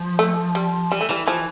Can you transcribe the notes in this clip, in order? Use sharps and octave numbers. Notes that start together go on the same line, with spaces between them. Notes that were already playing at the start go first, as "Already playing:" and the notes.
Already playing: F3
A3
G3
E3 G3
A3
E3 G3
E3 F3